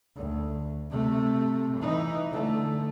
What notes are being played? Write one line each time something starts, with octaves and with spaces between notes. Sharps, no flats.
D2
C3 A3
E3 D#4
D3 A3